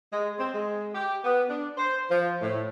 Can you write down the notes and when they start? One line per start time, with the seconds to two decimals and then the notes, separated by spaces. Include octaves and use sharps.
0.12 G#3
0.39 C4
0.54 G#3
0.95 G4
1.24 B3
1.49 D4
1.78 C5
2.11 F3
2.42 A2